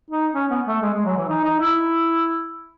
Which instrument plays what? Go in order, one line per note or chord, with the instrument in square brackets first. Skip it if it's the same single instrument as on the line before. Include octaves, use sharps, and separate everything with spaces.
[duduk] D#4
C#4
B3
A3
G#3
G#3
F#3
E3
D#4
D#4
E4